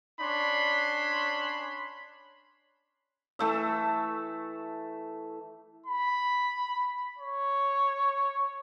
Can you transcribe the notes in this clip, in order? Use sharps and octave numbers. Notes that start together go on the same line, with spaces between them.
C#4 D4 C#5 B5 C6
E3 A3 E5
B5
C#5